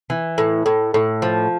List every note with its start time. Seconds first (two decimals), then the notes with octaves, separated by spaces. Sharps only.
0.10 E3
0.38 A2
0.66 A2
0.94 A2
1.22 F3